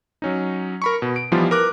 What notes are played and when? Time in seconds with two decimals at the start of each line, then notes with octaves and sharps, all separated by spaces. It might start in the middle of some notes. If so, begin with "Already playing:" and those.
0.22 F#3 C#4 D#4
0.82 A#4 B5 C#6
1.02 B2
1.16 D7
1.32 E3 F3 G3 B3 D#4 F4
1.51 A#4 B4 D6 F#6